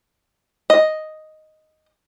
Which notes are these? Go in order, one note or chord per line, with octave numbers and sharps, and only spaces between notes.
D#5